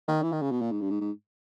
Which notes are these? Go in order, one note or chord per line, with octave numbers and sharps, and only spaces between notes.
D#3
E3
D#3
C#3
B2
A#2
G#2
G2
G#2
G#2